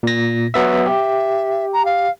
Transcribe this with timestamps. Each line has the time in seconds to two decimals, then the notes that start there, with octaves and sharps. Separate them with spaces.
0.03 A#2 A#6
0.54 F#3 B3 F#4 E5
0.86 G4 E5
1.72 A#5
1.85 F5